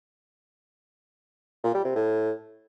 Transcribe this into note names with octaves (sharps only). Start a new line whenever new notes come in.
A#2
G3
C3
A2